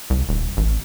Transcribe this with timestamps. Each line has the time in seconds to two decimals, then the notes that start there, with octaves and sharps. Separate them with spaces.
0.10 C2
0.29 D#1
0.57 A1